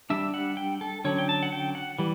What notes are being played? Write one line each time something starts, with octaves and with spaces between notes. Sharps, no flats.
G3 D4 E5
F#5
G5
A4
D3 F#3 C#4 C#5
G5
A5
F#5
G5
F#5
E3 G3